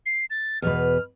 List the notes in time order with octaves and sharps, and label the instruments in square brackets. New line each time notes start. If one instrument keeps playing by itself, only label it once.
[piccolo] C7
A6
[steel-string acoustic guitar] E2 B2 B4 [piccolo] F6